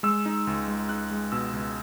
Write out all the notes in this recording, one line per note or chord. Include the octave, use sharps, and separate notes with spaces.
G#3 E6
D#4
C#2
G#3
D#4 F#6
G#3
B2 E6
C#2